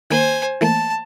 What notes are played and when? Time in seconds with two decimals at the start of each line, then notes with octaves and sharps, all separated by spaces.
0.10 D#3 A#3 C5 G#5
0.61 E3 A3 A#3 A5